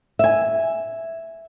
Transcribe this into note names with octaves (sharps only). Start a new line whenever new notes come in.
E5 G#5